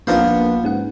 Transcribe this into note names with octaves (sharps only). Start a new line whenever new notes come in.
A#1 B3 C4 D4 D#4 F4 C5 A#5
A#3
G#2 C#4 G#4 F#5